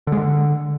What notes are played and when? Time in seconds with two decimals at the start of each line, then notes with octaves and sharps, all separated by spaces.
0.07 D3
0.12 G#3
0.17 D3